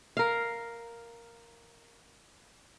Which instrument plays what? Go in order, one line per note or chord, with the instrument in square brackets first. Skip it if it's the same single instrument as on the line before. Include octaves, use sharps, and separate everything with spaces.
[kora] A#4 F5